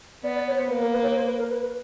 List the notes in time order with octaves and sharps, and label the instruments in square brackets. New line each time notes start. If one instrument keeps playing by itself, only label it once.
[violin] B3 [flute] D5
[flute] D5
C#5
C5
[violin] A#3 [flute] B4
[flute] A#4
B4
C#5
C5
B4
A#4
B4
B4